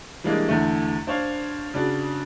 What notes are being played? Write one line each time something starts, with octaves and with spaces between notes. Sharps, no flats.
E3 G3 G#3 A#3 D4
E2 D3 A3
D4 C5 C#5 F5
C#3 D4 F#4